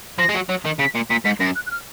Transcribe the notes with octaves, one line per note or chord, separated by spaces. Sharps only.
F3 A#6
G#3
F#3
F#3
D#3
C#3 B6
A#2
A#2 B6
G#2 B6
F#2 A#6
F#6
F#6
F6